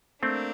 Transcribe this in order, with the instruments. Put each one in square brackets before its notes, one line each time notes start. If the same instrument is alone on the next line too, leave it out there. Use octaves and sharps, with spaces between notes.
[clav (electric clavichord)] A3 C4 [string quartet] A#3 D4